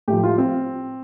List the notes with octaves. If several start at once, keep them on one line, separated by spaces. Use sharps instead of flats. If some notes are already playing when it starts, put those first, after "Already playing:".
A2 G4
F3
F4
C4